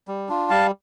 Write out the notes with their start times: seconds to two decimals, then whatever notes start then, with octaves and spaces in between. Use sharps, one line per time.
0.08 G3
0.29 D4 F4
0.50 G3 F5 A5